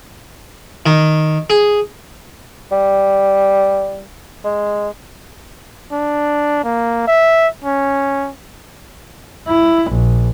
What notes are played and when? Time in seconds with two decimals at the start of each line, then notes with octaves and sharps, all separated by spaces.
0.86 D#3
1.50 G#4
2.71 G3
4.44 G#3
5.92 D4
6.64 A#3
7.08 E5
7.65 C#4
9.48 E4
9.90 A#1